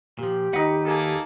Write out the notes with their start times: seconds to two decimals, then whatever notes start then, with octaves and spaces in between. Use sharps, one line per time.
0.19 A#2 F3 G4
0.53 D#2 D#4 B4 F#5
0.85 A#3 G#4 A4